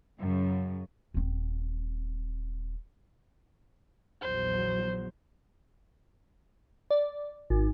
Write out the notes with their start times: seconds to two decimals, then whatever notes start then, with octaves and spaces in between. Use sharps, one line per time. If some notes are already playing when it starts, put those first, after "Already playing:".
0.18 F#2 C#3
1.14 D#1 C4
4.21 A#1 E2 F#3 C5
6.91 D5
7.50 G#1